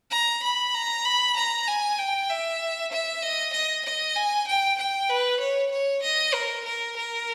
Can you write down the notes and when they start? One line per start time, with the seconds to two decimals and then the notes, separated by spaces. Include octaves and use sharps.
0.11 A#5
0.43 B5
0.74 A#5
1.05 B5
1.36 A#5
1.68 G#5
1.99 G5
2.30 E5
2.92 E5
3.22 D#5
3.53 D#5
3.85 D#5
4.16 G#5
4.47 G5
4.79 G5
5.10 B4
5.40 C#5
5.71 C#5
6.03 D#5
6.34 A#4
6.65 A#4
6.96 A#4